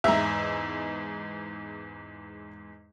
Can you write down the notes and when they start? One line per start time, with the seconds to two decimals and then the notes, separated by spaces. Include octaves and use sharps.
0.04 E2 G#2 E5 A#5